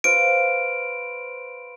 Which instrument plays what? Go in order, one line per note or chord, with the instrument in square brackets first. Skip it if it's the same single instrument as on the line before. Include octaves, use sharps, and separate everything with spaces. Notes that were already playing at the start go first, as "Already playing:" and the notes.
[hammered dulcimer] B4 C5 F5 [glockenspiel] D7